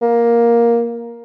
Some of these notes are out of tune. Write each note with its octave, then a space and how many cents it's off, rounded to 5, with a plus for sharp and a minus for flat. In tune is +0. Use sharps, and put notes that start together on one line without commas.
A#3 +10